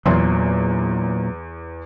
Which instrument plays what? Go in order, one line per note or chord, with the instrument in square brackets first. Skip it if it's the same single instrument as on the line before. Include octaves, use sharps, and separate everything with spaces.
[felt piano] E2 C6 [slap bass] A#2 F#3